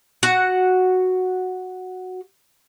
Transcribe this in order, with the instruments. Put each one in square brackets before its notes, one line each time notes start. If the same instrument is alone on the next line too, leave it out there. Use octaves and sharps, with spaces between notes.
[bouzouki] F#4 F#5